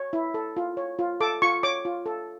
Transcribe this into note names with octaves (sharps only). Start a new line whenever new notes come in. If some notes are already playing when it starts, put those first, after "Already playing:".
Already playing: C#5
E4
A4
F4
C#5
F4
A4 D6
F4 C#6
C#5 D6
F4
A4